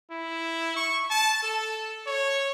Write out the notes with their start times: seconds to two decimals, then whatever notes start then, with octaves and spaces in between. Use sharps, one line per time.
0.11 E4
0.77 C#6
1.10 A5
1.43 A4
2.07 C#5